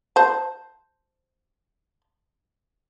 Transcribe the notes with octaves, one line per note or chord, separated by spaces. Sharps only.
C5 A5